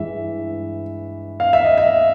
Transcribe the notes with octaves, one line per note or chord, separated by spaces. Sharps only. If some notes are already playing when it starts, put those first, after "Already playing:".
Already playing: G2 E3 G#3 E5
F5
E5
D#5
E5